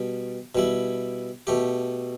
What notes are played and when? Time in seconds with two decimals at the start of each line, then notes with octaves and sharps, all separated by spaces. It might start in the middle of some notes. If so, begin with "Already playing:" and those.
Already playing: B2 G3
0.55 B2 G3 E4
1.47 B2 A3 G4